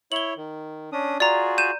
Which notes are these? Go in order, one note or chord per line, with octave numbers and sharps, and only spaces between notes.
E4 C#5 F#7 G7
D#3
C#4 D4 D#6
F4 F#4 G#4 D5 A#5
G6 D#7 E7